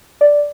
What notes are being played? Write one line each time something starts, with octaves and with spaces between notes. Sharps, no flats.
D5